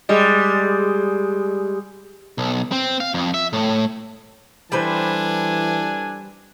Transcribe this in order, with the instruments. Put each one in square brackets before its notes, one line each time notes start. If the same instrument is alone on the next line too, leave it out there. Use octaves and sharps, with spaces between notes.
[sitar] G3 G#3
[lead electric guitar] B1
C4
F5
F2
E5
A2
[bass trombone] E3 [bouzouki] G3 B4 C5 [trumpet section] D4 A4 G#5